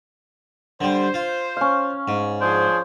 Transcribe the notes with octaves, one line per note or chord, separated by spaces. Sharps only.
D3 G3 C5
F4
C#4 F5
G#2
F3 D4 G#4 C5